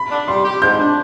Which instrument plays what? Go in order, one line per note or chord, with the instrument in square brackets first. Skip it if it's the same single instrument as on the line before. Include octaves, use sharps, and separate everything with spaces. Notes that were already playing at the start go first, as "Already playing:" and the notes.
Already playing: [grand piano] B5
[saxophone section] D4
[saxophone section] G3 [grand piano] C6
[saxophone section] G4
[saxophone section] G#2 [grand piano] G6
[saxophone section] D4